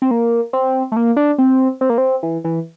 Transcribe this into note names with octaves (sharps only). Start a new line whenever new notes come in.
C4
A#3
C4
A3
A#3
D4
C4
C4
A#3
C4
E3
E3